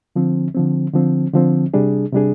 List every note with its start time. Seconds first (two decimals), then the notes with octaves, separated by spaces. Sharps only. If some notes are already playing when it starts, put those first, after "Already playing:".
0.16 D3 F3 C4
0.55 D3 F3 C4
0.94 D3 F3 C4
1.33 D3 F3 C4
1.74 C3 G3 D4 G#4
2.13 C3 G3 D4 G#4